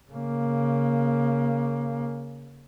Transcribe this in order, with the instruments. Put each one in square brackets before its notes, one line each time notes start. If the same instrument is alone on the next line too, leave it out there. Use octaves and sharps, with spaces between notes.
[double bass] C#3 A#3